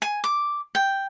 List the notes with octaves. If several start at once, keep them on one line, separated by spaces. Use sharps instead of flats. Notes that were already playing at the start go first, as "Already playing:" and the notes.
G#5
D6
G5